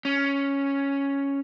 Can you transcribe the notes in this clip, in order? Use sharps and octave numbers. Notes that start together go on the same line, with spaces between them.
C#4